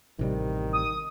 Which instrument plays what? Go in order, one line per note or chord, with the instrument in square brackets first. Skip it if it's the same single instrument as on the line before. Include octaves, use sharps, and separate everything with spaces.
[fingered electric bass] A1 C3 G3 [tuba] D#3
[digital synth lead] D#6